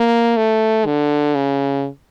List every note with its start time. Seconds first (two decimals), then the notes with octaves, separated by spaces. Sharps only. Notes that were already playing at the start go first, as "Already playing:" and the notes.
Already playing: A#3
0.37 A3
0.86 D3
1.35 C#3